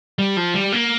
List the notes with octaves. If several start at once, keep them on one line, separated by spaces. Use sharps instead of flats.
G3
F3
G3
A#3